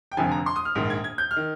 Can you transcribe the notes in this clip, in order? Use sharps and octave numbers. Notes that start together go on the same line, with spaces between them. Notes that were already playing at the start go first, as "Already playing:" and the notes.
G5
F1 F2 D3 F3 G#5
A#5
C6
D#6
F6
A#1 G#2 D#3
G#6
G#6
G6
F6
D#3